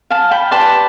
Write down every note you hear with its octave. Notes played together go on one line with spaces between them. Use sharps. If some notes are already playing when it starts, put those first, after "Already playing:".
F5 A5
G5 B5
G4 B4 D5 A5 C6